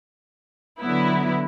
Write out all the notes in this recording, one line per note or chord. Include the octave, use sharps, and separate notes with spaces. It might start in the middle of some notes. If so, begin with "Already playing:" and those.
D3 F#3 B3 E4